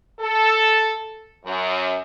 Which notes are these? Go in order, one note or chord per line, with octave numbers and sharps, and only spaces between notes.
A4
F#2